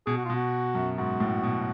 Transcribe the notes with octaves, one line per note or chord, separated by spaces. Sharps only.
B2 G#4
F#4
F4
B2
F#4
F#2
G#2 F#4
A2
B2